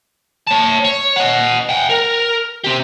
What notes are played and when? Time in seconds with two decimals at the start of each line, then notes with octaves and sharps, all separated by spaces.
0.47 C#5 A5
0.84 C#5
1.16 D#5 F#5
1.69 F#5 G5
1.89 A#4
2.64 C4 G4